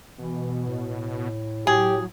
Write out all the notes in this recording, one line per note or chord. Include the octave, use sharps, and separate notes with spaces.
B2 E3
A2
A2 F#3 G4 G#4